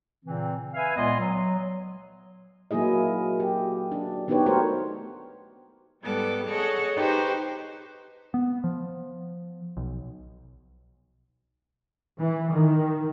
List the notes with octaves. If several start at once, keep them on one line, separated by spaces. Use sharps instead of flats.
A#2 C#3 E3 C4
B4 E5 F5 G#5
C#2 A#2 B3 D#5 C6
F#3
F#3 A#3 E4 G#4 D#5
G4
D4
B3 D4 D#4 G4 B4 C#5
A3 F#4 G4 A#4 C5 C#5
G#2 G3 B3 A4 D6
G#4 A4 C#5 D#5 F#5
D#4 G4 B4 C5 C#6
B3
F3
B1
E3
D#3